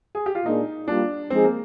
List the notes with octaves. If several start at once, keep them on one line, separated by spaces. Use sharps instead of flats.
G#4
G4
F4
A#2 G#3 D4 D#4
G3 A#3 D4 F4
F3 G#3 C4 D#4 G#4 C5
A#3